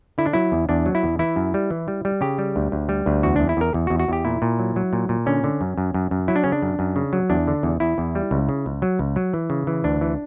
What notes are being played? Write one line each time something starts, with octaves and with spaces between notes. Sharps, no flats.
D3 E4
D4
F#3 E4
E2
E2 D4
F#3
E4
E2
E3 E4
F#2
G3
E3
G3
G3
C#3 G4
G3
D2
D2
G3
D2
E2 F#4
E2 D4
E4
E2 A#4
E2
E2 F#4
F#4
E2 G4
A#2 E4
A#2
F#3
F#3
A#2
A#2
D3 C#4
D3
F#2
F#2
F#2
F#2
F#3 E4
D4
C#3 C#4
D4
F#2
F#2
C#3
F#3
E2 D4
D3
E2
E2 E4
E2
G3
C#2
C#3
C#2
F#3
C#2
F#3
E3
C#3
E3
D2 D4
E3